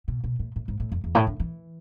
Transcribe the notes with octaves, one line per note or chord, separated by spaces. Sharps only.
B2
B2
A2
A2
G#2
A2
F2
E2
A2
D3
E3